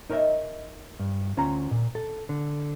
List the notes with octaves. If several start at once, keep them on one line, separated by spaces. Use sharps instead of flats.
D#4 A#4 C#5 D#5 E5
G2
D2 C#4 F4 F#5 A#5
A#2
A4
D3